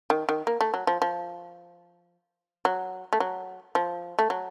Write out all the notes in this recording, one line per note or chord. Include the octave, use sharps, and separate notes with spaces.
D#3
D#3
A#3
A3
F#3
F3
F3
F#3
A3
F#3
F3
A3
F#3